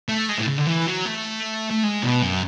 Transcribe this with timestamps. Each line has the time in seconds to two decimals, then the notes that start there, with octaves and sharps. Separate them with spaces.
0.09 A3
0.29 G#3
0.38 A2
0.48 C#3
0.58 D3
0.67 E3
0.87 F#3
1.05 A3
1.70 A3
1.83 G#3
2.03 B2
2.22 F#2